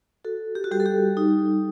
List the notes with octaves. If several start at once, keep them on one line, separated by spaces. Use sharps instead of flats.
F#4 A4
G4
F#4
G3 G4
A4
G4
D#4